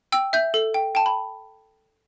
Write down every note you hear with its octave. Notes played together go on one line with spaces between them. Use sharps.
G5 E6
E5 G6
A4
G5
G5 A5
B5